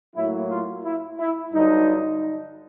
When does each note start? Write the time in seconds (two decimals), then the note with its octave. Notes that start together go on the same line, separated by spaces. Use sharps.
0.16 A2 F#3 A#3 E4
0.50 F4
0.84 E4
1.20 E4
1.54 G2 D3 F#3 D#4